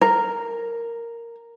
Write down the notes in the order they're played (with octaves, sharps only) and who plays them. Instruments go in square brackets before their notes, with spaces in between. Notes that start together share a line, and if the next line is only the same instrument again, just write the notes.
[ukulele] A#4